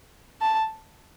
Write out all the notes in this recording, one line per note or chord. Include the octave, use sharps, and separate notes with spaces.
A5